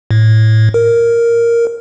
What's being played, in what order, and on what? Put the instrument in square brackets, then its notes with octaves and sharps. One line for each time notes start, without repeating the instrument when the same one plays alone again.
[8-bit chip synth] A2
A#4